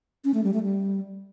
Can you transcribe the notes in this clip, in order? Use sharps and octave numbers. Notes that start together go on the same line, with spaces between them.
C#4
A3
G3
A3
G3